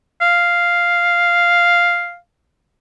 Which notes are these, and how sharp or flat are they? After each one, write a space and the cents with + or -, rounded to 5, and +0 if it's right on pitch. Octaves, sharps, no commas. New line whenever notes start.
F5 -5